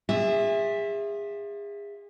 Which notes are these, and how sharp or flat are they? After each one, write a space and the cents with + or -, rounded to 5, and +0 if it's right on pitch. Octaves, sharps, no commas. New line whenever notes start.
F4 +25 G#4 -35 E5 +0